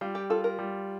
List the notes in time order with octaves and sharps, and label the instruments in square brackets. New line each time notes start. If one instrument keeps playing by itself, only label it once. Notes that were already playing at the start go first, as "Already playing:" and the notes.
[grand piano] G3 [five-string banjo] F4
[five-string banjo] G4
[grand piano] F4 [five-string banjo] A4
[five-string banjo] A#4
[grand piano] G3